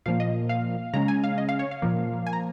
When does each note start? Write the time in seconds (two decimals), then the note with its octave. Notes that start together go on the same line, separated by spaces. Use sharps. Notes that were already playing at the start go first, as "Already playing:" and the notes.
0.06 A#2 F3 A#3 F5
0.20 D#5
0.49 F5
0.94 C#3 G#3 C#4 A#5
1.08 G#5
1.24 F5
1.38 D#5
1.49 F5
1.59 C#5
1.71 F5
1.82 A#2 F3 A#3
2.27 G#5
2.33 A#5